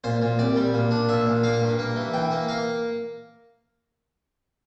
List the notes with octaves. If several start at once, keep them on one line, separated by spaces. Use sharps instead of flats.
A#2 C5
A#2
C2 D5
G3
A#2
D4
A#2 E5
A#2
A#3 F5
G2
A#3
E3
E3 G5
A#3
A#3 F5